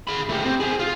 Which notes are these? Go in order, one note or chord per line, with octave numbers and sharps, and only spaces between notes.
G#4 B5
A3 G4
C4
G4 G#4
F4